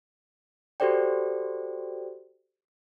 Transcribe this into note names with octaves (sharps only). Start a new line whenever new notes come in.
F#4 G4 A4 C5 D5 G5